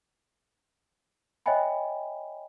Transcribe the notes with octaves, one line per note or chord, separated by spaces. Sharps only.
C#5 D#5 E5 G5 G#5 B5